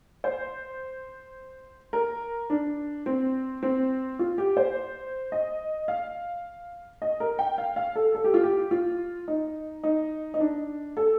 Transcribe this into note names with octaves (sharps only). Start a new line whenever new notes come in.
C5
A#4
D4
C4
C4
F4
G4
C5
D#5
F5
D#5
A#4
G5
F5
F5
A4
A4
G4
F4
G4
F4
D#4
D#4
D#4
D4
A4